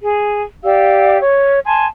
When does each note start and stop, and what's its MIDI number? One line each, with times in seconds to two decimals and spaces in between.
0.01 0.41 68
0.64 1.18 67
0.64 1.18 74
0.64 1.18 77
0.64 1.18 88
1.21 1.61 73
1.66 1.87 80
1.66 1.87 81
1.66 1.87 84